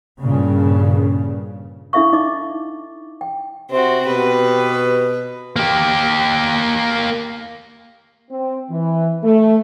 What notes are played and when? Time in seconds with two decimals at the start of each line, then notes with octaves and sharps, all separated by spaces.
0.23 G2 A#2 C#3
1.93 D4 E4 A4 E5 F5 C#6
2.13 D#4 D#5 D6
3.21 G5
3.71 C3 C4 F#4
4.07 B2 G4 B4
5.56 A#3 G4
8.30 C4
8.71 E3
9.23 A3